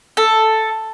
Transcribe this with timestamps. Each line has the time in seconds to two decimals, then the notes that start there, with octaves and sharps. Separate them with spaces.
0.17 A4